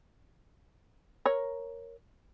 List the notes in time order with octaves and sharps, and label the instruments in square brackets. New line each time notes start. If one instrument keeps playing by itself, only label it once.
[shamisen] A#4 C#5